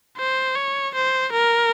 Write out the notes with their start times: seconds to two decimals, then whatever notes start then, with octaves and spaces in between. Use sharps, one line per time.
0.18 C5
0.55 C#5
0.94 C5
1.33 A#4